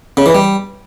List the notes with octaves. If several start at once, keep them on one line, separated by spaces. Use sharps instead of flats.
C#3
E3
G3